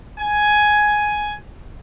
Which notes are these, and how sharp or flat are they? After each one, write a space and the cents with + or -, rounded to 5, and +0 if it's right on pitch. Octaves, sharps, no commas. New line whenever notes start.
G#5 +10